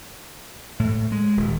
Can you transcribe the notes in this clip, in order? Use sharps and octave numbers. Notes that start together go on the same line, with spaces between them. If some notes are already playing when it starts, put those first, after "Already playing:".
A2
G#3
D#1